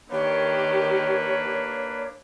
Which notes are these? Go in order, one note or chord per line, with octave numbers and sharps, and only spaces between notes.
D#3 A#3 D4 G4 B4 C#5